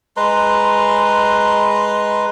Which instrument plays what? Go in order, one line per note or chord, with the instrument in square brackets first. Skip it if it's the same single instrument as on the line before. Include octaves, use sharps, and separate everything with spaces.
[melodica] G#3 B4 A#5 C6